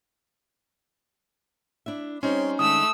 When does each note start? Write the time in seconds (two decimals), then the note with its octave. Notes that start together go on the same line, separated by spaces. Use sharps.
1.86 D4 E4 E5
2.23 G3 C4 C#4 D#4 C#5 C6
2.59 D#3 G#3 A3 D4 D#6 E6